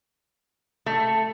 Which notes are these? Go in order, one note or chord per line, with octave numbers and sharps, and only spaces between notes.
A3